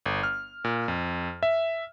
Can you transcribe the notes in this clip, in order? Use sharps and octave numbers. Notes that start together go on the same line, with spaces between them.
G1
F6
A#2
F2
E5